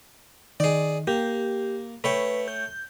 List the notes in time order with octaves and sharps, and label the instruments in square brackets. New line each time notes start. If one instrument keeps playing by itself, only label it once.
[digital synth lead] D#3 [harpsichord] G#4 D5
[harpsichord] A#3 [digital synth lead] G4
[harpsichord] A3 C#5 G5 [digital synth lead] B4
[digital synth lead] G6